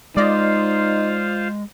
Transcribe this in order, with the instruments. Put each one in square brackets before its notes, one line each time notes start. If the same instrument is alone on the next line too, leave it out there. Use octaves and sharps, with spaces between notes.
[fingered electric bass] G#3 [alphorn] D#4 [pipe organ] F4 C5 F5 [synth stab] D5 D#5